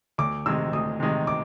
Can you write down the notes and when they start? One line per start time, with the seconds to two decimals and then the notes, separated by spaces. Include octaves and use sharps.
0.18 D2 D6
0.46 C3 D#3 G#3 E6
0.73 D2 D#6
1.00 C3 D#3 G#3
1.27 D6